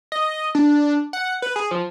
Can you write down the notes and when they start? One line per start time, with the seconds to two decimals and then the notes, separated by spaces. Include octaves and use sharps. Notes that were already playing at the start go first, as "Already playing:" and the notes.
0.12 D#5
0.55 D4
1.13 F#5
1.42 B4
1.56 G#4
1.71 F3